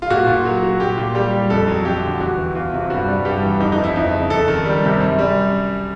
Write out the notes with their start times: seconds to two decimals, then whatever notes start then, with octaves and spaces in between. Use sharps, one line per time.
0.02 F4
0.10 A#2 F#4
0.27 A#2
0.45 F#3
0.62 F#3
0.80 A#2 G4
0.98 A#2
1.15 G3 G4
1.33 G3
1.50 F2 A4
1.68 F#3
1.85 F2 G4
2.03 D3
2.20 E2 F#4
2.38 E3
2.55 E2 F4
2.73 C3
2.90 G2 F#4
3.08 G3
3.25 G2 G4
3.43 E3
3.60 F2 D#4
3.72 D#4
3.78 F3
3.84 E4
3.96 F2
4.13 C#3
4.30 F2 A4
4.48 D#3
4.65 G3
4.84 C3
5.00 F#2
5.19 G3